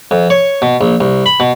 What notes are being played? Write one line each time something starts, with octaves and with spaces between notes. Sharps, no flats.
F2
C#5
B2
A#1
C2
B5
B2